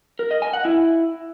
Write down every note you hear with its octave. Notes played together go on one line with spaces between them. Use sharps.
A#4
D#5
G#5
F#5
E4